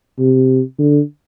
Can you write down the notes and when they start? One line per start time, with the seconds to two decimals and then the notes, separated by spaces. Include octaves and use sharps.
0.19 C3
0.79 D3